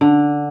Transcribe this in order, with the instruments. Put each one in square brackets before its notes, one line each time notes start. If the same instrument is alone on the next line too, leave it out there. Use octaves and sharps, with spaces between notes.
[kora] D3